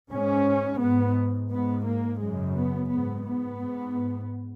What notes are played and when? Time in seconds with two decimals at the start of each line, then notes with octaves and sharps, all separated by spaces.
0.11 G#2 C#4
0.81 G#2 B3
1.51 G#2 B3
1.86 A#3
2.21 F#2 C#3 G#3
2.57 B3
2.91 G#2 B3
3.26 B3
3.61 G#2